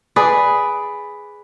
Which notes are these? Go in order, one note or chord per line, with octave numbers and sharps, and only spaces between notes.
G#4 B4 D5